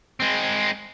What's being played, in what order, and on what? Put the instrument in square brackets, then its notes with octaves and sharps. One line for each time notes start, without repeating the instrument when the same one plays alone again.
[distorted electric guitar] G#3 C4